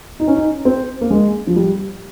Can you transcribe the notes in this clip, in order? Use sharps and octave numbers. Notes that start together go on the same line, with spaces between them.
D#4
C#4
D#4
C4
A#3
G#3
F3
G3